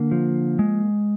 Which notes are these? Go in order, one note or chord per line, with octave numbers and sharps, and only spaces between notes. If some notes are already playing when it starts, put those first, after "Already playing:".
Already playing: D3 A#3
F3
G#3